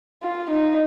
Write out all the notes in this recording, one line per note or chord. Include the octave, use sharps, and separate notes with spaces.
F4
D#4